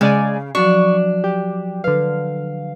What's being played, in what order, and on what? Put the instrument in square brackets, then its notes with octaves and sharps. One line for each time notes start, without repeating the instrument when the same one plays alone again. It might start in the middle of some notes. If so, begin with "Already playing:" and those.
[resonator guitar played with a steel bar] C#3 [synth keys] G#3 D5 G#5
[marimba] F3 F#3 F#4 [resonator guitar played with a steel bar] D4 [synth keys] C#6
[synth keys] G4
[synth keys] D3 F5 [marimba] B4